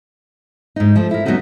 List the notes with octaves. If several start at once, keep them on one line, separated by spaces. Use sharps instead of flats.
G#2 D#4
F3 A3
E4 A#4
F#3 G3 B3 C#4 D#4 F#4